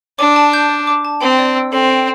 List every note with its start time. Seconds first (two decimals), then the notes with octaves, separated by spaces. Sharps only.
0.19 D4 D6
0.36 A5
0.53 G6
0.69 D5
0.87 D6
1.05 A5
1.21 C4 G5
1.39 D5
1.55 E6
1.72 C4 A4
1.89 G5